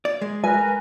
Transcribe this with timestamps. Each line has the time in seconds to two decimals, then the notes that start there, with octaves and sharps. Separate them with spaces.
0.05 D5
0.22 G#3
0.44 A#4 B4 G#5 A#5